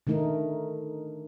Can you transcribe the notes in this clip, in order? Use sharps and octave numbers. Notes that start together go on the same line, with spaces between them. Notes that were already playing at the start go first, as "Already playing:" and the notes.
D3 D#3 A3 D#4 A4 A#4